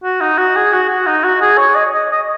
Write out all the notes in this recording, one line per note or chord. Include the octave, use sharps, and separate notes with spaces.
F#4
D#4
F#4
G#4
F#4
F#4
D#4
F#4
G#4
C#5
D#5
D#5
D#5